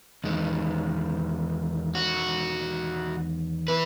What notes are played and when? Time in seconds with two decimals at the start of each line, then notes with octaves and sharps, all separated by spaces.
0.24 E2 D#3 G#3
1.95 F#4
3.68 E3 B4